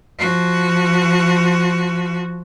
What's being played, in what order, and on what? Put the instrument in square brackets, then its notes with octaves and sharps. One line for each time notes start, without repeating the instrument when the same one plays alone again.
[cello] F3 F#4